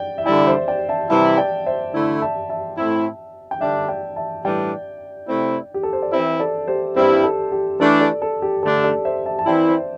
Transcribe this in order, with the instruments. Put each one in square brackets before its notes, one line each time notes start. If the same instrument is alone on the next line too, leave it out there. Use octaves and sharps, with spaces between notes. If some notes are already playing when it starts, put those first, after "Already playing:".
Already playing: [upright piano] D5 G5
E5
[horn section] D3 G3 E4 [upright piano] D5 G5
[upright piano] C5 E5
D5 G5
E5 A5
[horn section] C3 E3 G3 E4 [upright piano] E5 A5
[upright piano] D5 G5
C5 E5
[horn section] D3 A3 E4
[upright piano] E5 A5
E5 A5
[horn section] A2 A3 C4 E4
[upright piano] G5
[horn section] D3 G3 D4 [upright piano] E5 A5
[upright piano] D5 G5
E5 A5
[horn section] A2 E3 G3 D4 [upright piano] D5 G5
[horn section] C3 A3 C4 E4
[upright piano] G4
A4
C5
D5
[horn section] E3 C4 E4 [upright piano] C5 E5
[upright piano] A4 D5
G4 C5
[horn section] G2 G3 C4 E4 [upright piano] G4 C5
[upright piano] A4
G4
[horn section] E3 A3 D4 [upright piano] A4
[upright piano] A4 D5
A4
G4
[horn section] D3 A3 D4 [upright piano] A4
[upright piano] A4 D5
C5 E5
E5 A5
A5
[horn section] E3 C4 E4 [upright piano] D5 G5
[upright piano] C5 E5